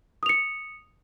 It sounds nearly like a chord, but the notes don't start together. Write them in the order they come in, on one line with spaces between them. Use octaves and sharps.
D#6 F7 C#7